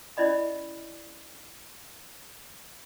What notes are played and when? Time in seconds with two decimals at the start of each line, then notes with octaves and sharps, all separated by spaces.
0.17 C#4 E4 D5 D#5 B5